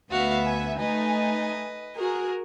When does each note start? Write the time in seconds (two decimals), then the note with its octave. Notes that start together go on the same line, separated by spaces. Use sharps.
0.11 D2 B3 F#4 E5 F5
0.46 G#5
0.79 A3 D#4 B4 D#5 G#5
1.98 F#4 G#4 A#4